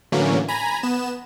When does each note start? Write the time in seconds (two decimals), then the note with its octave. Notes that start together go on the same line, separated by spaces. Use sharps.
0.12 A2 D3 E3 F#3 A#3 C#4
0.48 G#5 A#5 B5
0.83 B3 E7